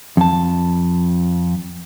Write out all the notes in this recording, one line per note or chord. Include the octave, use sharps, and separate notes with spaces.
F2 A5